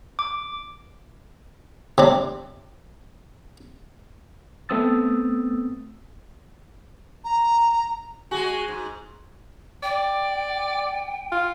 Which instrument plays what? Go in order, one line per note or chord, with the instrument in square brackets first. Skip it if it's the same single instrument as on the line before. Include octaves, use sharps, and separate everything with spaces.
[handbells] D6
[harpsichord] C3 D4
[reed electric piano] A3 B3 C4 D#6 E6 A6
[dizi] A#5
[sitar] G#3 F#4 [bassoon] G#4
[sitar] G#2
[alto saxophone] D5 [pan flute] G5
[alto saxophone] F4